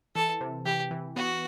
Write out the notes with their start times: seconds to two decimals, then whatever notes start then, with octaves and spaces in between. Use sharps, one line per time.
0.15 E3 A4
0.41 C3
0.65 E3 G4
0.91 E3
1.16 B3 F#4